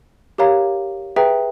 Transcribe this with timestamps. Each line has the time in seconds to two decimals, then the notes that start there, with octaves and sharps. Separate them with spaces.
0.38 G4 A#4 C#5 F5 A#5
1.16 G#4 B4 E5 G5 A#5